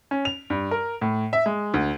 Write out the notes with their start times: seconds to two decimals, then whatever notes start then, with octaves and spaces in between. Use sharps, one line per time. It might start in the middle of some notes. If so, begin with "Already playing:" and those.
0.11 C#4
0.25 F7
0.50 G2
0.71 A#4
1.01 A2
1.33 E5
1.46 G#3
1.74 D2